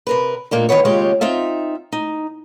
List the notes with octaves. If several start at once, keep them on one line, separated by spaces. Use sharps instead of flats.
C3 A#4 B4
A#2 A#3 D4 D#4
D#3 E3 B3 C#5
D#2 C#3 G#3 F4 G4 C#5
C4 D#4 F4 E5
D#4